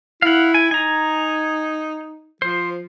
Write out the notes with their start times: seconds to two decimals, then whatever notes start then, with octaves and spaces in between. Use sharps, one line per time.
0.22 E4 F5 F#5
0.54 G#5
0.71 D#4 G#5 A#5
2.42 F3 C5